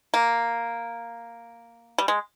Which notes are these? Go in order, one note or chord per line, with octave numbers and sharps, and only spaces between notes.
A#3
G3
G#3